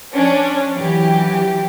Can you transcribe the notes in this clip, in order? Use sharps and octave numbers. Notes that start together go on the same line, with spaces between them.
F3 C#4 D4
E3 F#3 G4